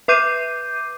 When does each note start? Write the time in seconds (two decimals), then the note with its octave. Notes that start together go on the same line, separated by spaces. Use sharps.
0.08 B4 E5 D6 G6 C7 D#7